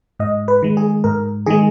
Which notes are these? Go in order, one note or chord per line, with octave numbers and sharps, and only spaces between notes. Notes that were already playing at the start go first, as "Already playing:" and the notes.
G#2 D#5
B4
D#3 G#3
G#4
G#2 A#4
D#3 G#3 G#4